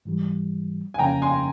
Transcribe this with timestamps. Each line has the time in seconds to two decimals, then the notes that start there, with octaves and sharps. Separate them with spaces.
0.05 G#2 E3 G3
0.94 G#5
0.99 F2 C#3 F3 A#3 C#4 G5 A#5
1.22 G#5 C6